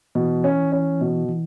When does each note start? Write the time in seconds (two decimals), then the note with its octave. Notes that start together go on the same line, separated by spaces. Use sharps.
0.15 B2 E3
0.44 C#4
0.72 C#4
1.01 B2
1.29 E3